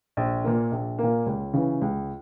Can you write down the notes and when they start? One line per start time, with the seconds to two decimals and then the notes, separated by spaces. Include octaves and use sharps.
0.17 A#1
0.44 A#2 A#3
0.72 A#1
0.98 A#2 A#3
1.26 C#2
1.54 C#3 E3
1.81 C#2